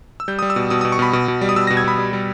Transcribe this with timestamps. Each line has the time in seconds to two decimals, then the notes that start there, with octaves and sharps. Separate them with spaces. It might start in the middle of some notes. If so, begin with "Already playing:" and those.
0.20 E6
0.28 G3 G6
0.39 G3 D#6
0.50 E6
0.56 B2
0.70 B2 D#6
0.81 B2 D#6
0.92 C#6
0.99 B2 B5
1.13 B2
1.28 B2
1.41 G3
1.49 D#6
1.56 B2 E6
1.67 B2 A#6
1.77 G#6
1.84 B2 B5
1.98 G3
2.13 G3